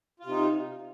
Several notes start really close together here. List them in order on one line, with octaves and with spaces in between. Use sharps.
F4 C3 D#4